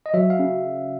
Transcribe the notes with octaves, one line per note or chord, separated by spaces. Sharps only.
D#5
F#3 E5
F5
C#3